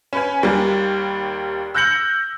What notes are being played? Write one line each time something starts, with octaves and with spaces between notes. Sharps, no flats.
C#4 B4 G#5
D#2 G3 A#3
E6 F#6 G6 A#6 C#7 F#7